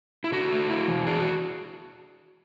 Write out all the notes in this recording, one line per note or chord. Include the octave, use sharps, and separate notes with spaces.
E4
D3 F#4
A3
E4
E3
D4 G#4
F#4